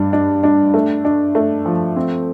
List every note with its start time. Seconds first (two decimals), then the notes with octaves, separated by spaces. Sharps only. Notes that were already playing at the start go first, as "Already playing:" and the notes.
Already playing: G2 D4
0.13 D4
0.43 D4
0.74 A3
1.05 D4
1.35 A3
1.66 F3
1.96 C4